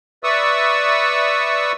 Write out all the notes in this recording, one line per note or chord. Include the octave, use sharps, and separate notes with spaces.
B4 D5 E5 C#6 D#6 E6